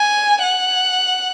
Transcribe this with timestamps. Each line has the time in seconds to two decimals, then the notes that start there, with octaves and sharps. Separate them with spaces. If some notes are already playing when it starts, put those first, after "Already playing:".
Already playing: G#5
0.43 F#5